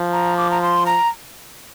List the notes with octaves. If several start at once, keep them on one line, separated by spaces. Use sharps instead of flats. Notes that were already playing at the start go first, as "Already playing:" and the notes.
Already playing: F3
A#5
D6
A#5
C6
A#5